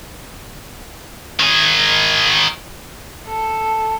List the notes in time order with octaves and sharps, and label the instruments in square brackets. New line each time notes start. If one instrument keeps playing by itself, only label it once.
[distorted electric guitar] D#3 G#4
[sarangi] A4